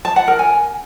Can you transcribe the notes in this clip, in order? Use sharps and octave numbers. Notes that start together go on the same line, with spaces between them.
A5
F#5
A#4
G#5